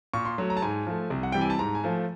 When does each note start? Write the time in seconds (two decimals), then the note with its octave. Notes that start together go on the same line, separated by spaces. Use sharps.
0.13 A#2 C#6
0.25 C6
0.38 F#3 A3
0.50 A#5
0.57 A5
0.62 G#2 G#5
0.87 F3 A3
1.10 C2
1.23 F#5
1.32 C3 E3 G3 G5
1.41 G#5
1.50 A5
1.59 G#2 A#5
1.75 G#5
1.84 F3 A3